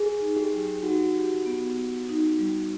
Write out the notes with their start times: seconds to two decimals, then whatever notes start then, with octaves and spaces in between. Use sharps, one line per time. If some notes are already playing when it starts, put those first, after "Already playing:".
Already playing: G#4
0.21 D#4
0.36 G4
0.46 G#4
0.52 F#3 G4
0.83 D#4 F#4
1.15 G4
1.46 B3
1.77 B3
2.09 D#4
2.39 G3